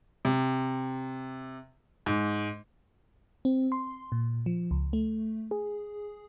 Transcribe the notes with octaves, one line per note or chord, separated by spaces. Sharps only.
C3
G#2
C4
C6
A#2
F3
C#2
A3
G#4